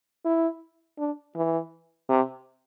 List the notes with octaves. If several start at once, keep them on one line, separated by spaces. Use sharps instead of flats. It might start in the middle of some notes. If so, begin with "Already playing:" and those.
E4
D4
E3
C3